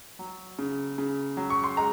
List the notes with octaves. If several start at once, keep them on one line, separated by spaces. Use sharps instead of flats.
F#3
C#3
C#3
F#3
C#6
C6
G#3 A#5